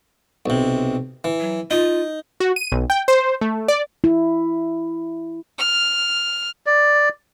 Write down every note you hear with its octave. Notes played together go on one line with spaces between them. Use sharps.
B1 C3
E3
F#3
D#4 F4
F#4
D#7
B1
G5
C5
A3
D5
E4
F6
D5